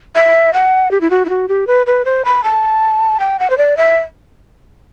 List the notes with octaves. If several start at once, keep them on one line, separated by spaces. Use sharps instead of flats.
E5
F#5
G4
E4
F#4
E4
F#4
G4
B4
B4
C5
B5
A5
G5
F#5
C5
D5
E5